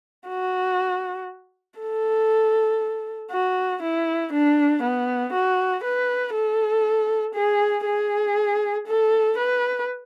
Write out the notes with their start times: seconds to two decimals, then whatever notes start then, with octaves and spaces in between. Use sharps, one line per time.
0.28 F#4
1.80 A4
3.31 F#4
3.82 E4
4.33 D4
4.83 B3
5.33 F#4
5.84 B4
6.34 A4
7.34 G#4
7.86 G#4
8.86 A4
9.37 B4